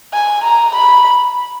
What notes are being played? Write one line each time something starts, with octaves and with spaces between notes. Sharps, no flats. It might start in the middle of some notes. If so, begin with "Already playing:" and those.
G#5
A#5
B5